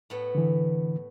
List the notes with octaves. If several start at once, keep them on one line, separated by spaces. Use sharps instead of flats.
A2 B3
D3 E3